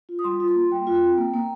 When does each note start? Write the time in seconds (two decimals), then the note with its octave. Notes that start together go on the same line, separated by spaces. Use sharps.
0.09 F4
0.19 D#6
0.24 G3 C6
0.40 F4
0.48 C6
0.55 A#3
0.71 G3 G5
0.87 F4
1.01 C4
1.18 A#3
1.34 A#3